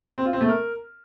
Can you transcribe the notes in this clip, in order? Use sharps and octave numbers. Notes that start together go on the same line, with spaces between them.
C4
F4
C4
A3
A#4